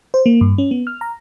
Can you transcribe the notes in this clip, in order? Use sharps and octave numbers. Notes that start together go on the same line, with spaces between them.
C5
A#3
G2
C#4
B3
F6
A#5